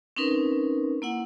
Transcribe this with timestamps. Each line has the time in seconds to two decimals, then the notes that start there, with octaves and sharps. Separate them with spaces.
0.17 C4 C#4 D#4 A#4 B4
1.02 A#3 E4 F#5